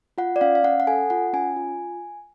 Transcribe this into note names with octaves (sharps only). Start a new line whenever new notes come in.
F4 F#5
D5
C#4 F5
F5
C#4 F#5
F#5
A4 G#5
F4 F#5
C#4 G#5
F4